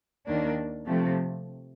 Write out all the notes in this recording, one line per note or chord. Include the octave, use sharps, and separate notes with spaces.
D#2 D#3 A#3 D4
C3 F3 A3